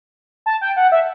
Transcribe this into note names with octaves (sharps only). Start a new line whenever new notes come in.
A5
G5
F#5
E5